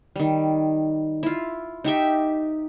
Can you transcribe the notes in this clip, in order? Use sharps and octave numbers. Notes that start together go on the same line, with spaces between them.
D#3 G3
E4 F4
D#4 G4 E5 G5